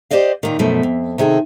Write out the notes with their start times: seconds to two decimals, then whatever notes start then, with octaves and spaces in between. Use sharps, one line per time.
0.11 G4 A#4 C5 D5 D#5 F5
0.43 D#2 A#2 D#3
0.59 F#2 B2 F3 A3
0.83 F2
1.18 C3 D#3 G#4 A4